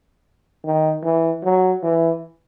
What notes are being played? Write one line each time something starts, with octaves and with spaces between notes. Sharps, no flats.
D#3
E3
F#3
E3